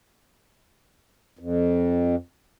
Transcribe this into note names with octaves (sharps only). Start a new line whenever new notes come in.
F2